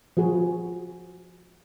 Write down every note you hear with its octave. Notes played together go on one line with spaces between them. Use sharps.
F3 F#4 G#4